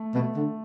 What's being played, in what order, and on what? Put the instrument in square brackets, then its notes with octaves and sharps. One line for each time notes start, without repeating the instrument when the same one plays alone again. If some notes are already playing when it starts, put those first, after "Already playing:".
Already playing: [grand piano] A3
[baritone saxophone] B2 [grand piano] A3
[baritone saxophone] D3